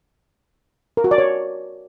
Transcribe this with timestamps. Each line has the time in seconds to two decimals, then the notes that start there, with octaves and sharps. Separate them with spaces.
0.97 A#4
1.04 F#4
1.11 D5
1.18 C#5